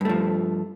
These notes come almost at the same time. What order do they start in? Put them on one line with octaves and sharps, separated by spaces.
G2 A3 F3